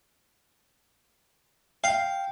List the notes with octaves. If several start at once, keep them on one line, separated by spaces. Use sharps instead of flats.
F5 G5